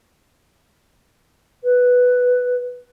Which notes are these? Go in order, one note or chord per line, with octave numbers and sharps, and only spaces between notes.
B4